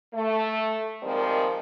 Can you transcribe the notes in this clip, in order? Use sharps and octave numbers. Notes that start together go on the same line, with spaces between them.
A3
D#3 F3 G3 G#3 A#3 C4